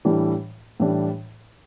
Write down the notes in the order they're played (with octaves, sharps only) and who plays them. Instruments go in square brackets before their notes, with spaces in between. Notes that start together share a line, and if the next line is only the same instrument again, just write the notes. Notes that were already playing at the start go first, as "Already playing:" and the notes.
[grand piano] A2 E3 G3 D4
A2 E3 G3 D4